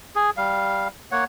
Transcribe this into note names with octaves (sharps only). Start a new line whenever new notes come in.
G#4
G3 F5
A#3 C#5 F#5